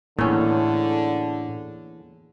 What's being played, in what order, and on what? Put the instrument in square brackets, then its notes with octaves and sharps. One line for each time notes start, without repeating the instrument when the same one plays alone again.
[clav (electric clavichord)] E2 C#4 [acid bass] A2 [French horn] D3 [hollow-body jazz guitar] A#3 G#4 A4